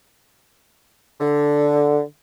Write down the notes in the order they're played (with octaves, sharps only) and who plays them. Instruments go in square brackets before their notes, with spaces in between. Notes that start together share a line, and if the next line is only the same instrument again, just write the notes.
[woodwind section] D3